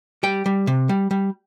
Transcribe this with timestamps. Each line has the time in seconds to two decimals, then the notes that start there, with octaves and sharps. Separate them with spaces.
0.23 G3 G5
0.46 G3
0.67 C3
0.89 G3
1.11 G3